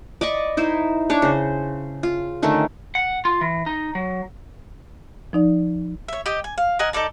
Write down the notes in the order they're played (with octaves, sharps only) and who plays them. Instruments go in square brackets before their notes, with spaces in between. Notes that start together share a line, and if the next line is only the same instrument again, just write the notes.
[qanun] D5 D#5 B5 C#6
D#4 E4 C5
D4 C#5 D5
C#3 C5
F4
D3 D#3 A3 C#4
[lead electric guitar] F#5
F4
E3
D#4
F#3
[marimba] F3 D#4 D5
[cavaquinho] C#5 E5
G4 D#5 G5
G#5
F5
A#4 D#5 F#5 G#5
D#4 A4 D5 A5